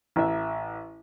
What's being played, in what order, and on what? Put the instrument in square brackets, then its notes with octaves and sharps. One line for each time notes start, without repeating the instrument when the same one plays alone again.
[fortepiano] A1 E5